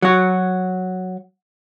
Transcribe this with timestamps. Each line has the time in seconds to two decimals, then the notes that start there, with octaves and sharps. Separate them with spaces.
0.02 F#3 F#4